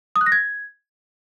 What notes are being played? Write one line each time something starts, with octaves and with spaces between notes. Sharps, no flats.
D#6
F#6
A#6
G#6